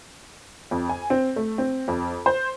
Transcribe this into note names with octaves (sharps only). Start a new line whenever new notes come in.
F2
G#5
C4
A3
C4
F2
C5